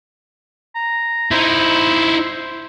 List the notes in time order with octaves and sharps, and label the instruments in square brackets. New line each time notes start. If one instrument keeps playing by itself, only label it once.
[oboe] A#5
[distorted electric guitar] D#4 E4 [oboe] C5